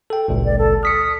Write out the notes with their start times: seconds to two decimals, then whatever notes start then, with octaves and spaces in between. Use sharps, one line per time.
0.10 A4 G5
0.28 G#1 C#2 A#2
0.45 D5
0.58 A4
0.83 D#6 F6 B6 C#7